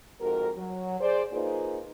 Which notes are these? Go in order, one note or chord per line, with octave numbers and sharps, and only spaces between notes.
F2 G#2 F#4 A#4
F#3
G#4 C5 D5
A#3 D#4 F4 G#4 B4 C5